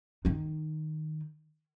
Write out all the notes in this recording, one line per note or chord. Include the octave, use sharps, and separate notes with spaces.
D#3 D#4